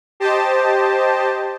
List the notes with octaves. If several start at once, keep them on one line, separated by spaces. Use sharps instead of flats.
G4 C5 D#5 A5